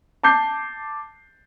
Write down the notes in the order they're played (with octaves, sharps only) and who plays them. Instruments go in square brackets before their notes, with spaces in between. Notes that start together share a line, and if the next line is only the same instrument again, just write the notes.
[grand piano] A5 D6 G6 C7